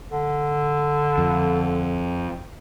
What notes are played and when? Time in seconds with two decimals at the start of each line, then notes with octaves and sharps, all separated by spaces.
0.11 D3
1.18 F2